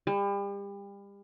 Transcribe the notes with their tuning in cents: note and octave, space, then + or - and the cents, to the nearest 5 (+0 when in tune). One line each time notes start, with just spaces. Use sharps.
G3 +35